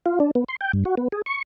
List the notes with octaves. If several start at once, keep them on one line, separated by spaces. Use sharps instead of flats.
F4
D4
B3
C6
G5
G2
F#4
B3
G#4
C#6